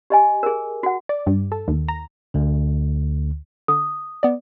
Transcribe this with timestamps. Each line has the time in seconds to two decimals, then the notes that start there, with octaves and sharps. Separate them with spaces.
0.10 G4 D#5 G#5
0.43 G#4 A#4
0.83 F#4 F#5
1.09 D5
1.27 G2
1.52 A4
1.68 D#2
1.89 A#5
2.34 D2 D3
3.68 D3 D#6
4.23 B3 D5